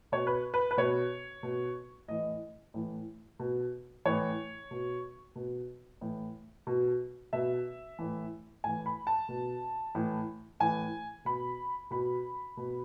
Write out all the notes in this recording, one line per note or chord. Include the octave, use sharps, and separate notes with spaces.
B2 C#5
B4
B4
B4
B2 C#5
B2
A2 E3 D#5
A2 E3
B2
A2 E3 C#5
B2
B2
A2 E3
B2
B2 E5
A2 E3
A2 E3 G#5
B5
A5
B2
A2 E3
A2 E3 G#5
B2 B5
B2 B5
B2